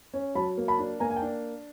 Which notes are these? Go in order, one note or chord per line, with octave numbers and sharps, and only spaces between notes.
C#4
F#3 A5 B5
A#3
A5 B5
D4
A#3 G#5 A#5
G#5
G5 A5
D4